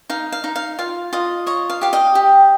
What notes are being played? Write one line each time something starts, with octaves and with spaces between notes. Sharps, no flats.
D#4 F5
F5
D#4
F5
F4 F5
F4 D#5
C#5 D#5
F5
G4 F5
D#5 G5
G4